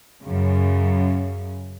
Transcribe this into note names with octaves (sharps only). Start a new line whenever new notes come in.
F#2 C#3